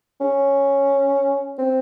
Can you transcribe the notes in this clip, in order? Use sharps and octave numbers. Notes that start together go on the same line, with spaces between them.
C#4
C4